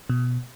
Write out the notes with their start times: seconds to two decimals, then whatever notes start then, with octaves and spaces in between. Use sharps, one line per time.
0.09 B2